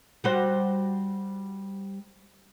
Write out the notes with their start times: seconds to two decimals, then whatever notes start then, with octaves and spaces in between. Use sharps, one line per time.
0.24 G3 F#4 C5